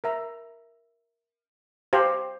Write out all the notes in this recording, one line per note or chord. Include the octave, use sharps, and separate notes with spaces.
A#4 E5 A#5
G4 C5 F5